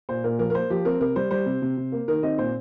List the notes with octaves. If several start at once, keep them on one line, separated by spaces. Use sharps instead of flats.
A#2 C5
A#2 A#4
F3 A#4
A#4
A#3 C5
F3 G4
C4 A#4
C3 A#4
G3 C5
G3 C5
C3
C3
C3
A#3
D#3 A#4
C4 D#5
A#2 C5